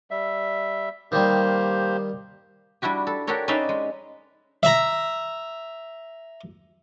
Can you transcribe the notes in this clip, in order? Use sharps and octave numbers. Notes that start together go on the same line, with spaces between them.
G3 E5
D#3 G3 A#3 G4 C5
G3 D4 E4 F#4 G4
A4
D4 F#4 G4 A4 A#4 C#5
C#4 D#4 B4 D5 E5 F5
G#3
E5 A#5